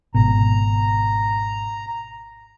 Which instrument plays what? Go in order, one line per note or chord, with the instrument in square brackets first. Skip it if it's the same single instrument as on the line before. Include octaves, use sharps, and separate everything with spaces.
[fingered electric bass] G#1 B2 [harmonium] A#5